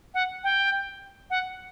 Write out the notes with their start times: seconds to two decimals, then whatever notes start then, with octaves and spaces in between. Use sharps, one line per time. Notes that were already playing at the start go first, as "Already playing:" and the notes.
0.14 F#5
0.44 G5
1.30 F#5